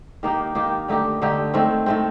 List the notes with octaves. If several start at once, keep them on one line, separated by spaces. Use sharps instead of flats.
D#3 A#3 D#4 G4
D#3 A#3 D#4 G4
D3 A3 D#4 G4
D3 A3 D#4 G4
D#3 A3 C4
D#3 A3 C4